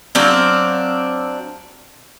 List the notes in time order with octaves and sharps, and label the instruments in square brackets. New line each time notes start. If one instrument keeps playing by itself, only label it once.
[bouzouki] F#3 C4 D4 F5